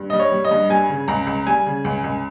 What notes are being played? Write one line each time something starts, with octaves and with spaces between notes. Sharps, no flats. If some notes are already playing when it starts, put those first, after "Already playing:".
Already playing: G2
G3 D#5
C#5
G3
D#5
G2
G3 G#5
C#3
C#2 A#5
C#2
G3 G#5
C#3
C#2
C#2